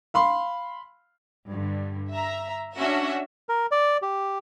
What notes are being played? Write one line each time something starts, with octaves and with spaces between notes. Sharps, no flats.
F5 B5 C6
G2 D3
E5 A#5
C#4 D4 F#4 E5
A#4
D5
G4